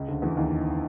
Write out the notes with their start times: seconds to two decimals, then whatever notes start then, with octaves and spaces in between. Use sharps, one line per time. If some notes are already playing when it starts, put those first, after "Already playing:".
Already playing: C#2 C#3
0.08 D2 D3
0.22 E2 E3
0.37 D#2 D#3